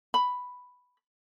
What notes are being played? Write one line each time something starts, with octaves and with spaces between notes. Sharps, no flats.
B5